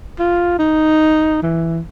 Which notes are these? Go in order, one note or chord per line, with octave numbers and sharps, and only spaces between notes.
F4
D#4
E3